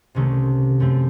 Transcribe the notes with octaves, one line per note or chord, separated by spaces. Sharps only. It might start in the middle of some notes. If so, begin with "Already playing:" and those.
C2 C3 D#3 A3 C#4
F#2 F3 A3 C4